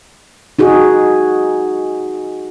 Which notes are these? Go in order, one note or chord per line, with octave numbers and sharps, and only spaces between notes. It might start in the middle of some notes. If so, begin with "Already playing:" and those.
D#4 F#4 G#4